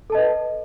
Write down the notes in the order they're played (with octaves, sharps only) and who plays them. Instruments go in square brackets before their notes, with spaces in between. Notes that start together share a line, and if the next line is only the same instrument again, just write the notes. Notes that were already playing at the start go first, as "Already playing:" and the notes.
[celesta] A4
A5
D#5
B4